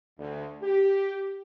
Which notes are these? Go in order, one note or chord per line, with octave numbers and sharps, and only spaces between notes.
D2
G4